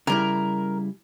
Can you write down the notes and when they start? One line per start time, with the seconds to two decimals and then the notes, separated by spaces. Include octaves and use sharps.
0.07 C#3 G3 E4 A#4